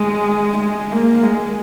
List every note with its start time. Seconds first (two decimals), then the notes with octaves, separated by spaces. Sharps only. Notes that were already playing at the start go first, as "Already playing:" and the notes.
Already playing: G#3
0.59 G#3
0.92 A#3
1.23 G#3